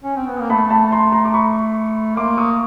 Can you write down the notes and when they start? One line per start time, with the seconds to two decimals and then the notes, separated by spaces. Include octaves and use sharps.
0.04 C#4
0.16 C4
0.26 B3
0.39 A#3
0.50 A3 A5 B5
0.70 A5 B5
0.91 A#5 C6
1.12 A#5 C6
1.25 D6
1.34 B5 C#6
2.17 A#3 C6 D6
2.37 C#6 D#6